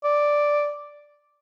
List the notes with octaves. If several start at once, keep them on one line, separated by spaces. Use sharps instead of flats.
D5